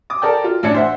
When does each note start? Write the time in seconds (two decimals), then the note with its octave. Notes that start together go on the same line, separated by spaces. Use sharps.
0.10 D6 D#6
0.22 A4 A#4 D5 G5
0.44 F4
0.63 A1 A2 D4 D5 G#6 C#7
0.74 C5 E5 F#5